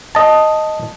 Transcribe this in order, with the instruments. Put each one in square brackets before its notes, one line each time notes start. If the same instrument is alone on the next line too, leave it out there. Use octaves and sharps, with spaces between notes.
[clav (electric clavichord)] D#5 A5